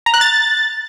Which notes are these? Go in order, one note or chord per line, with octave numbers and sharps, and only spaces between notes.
A#5
F#6
A6